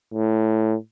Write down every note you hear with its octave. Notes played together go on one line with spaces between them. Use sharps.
A2